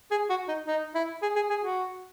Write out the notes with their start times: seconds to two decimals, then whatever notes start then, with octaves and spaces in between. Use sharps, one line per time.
0.11 G#4
0.30 F#4
0.48 D#4
0.68 D#4
0.95 E4
1.23 G#4
1.36 G#4
1.50 G#4
1.64 F#4